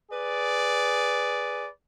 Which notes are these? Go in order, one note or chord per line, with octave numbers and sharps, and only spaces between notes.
G#4 B4 D5